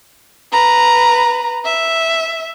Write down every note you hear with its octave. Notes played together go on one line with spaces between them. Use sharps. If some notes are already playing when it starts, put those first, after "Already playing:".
B4 A#5
E5